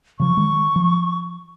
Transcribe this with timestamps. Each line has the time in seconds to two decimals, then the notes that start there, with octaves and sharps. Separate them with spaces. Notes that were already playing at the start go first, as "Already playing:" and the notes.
0.20 C#3 F3 C#6
0.37 D#3 G#3
0.76 F3